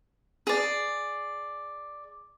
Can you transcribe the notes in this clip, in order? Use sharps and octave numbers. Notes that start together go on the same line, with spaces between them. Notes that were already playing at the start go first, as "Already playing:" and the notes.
G#4 D5